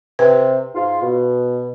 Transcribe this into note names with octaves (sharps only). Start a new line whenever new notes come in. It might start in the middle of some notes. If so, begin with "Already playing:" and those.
C3 B4
G#2 F4
B2